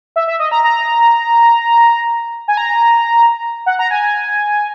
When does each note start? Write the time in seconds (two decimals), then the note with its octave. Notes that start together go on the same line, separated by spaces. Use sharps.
0.16 E5
0.27 E5
0.39 D#5
0.51 A#5
0.64 A#5
2.48 G#5
2.57 A#5
3.66 F#5
3.79 A#5
3.91 G#5